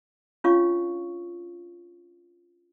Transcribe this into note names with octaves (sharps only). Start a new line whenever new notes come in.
C#4 D4 F4 C#5 F5 C#6